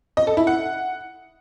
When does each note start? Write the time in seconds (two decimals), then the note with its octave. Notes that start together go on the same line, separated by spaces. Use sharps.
0.17 D#5
0.27 A4
0.37 E4
0.47 F#5